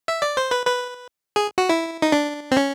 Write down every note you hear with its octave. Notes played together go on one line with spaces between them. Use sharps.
E5
D5
C5
B4
B4
G#4
F#4
E4
D#4
D4
C4
C#4